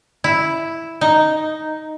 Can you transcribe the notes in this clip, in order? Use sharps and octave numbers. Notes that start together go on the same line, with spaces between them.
E4
D#4